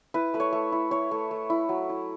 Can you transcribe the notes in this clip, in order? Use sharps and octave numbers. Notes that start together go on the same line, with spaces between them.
E4 B4
A3 B4
C#5
A3
E4
E4 C#5
A3
A3
E4
F#3
E4